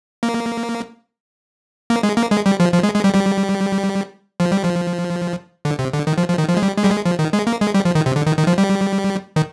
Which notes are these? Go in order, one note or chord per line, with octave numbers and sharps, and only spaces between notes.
A#3
A#3
G#3
A#3
G#3
G3
F3
F3
G#3
G#3
G3
G3
F3
G3
F3
D3
C3
D3
D#3
F3
F3
D#3
F3
G#3
G3
G#3
G3
G#3
F3
D#3
G#3
A#3
G#3
G3
F3
D#3
C3
D3
D#3
D#3
F3
G3
D#3